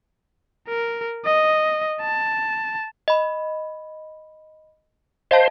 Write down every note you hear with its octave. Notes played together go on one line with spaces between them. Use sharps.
A#4
D#5
A5
D#5 B5
C5 D#5 F5 A5